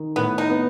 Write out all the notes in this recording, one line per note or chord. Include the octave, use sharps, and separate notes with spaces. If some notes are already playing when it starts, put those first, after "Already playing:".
Already playing: D#3
A2 B3
D#4
B3